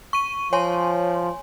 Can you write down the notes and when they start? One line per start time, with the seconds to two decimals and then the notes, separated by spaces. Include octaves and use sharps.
0.13 C#6 D#7
0.53 F3 C#5 G#5 C6